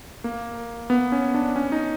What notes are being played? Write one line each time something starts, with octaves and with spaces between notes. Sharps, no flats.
A#3
B3
C#4
D4
C#4
D#4